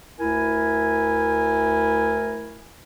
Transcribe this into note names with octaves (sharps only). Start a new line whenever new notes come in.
D2 E4 A#4 G#5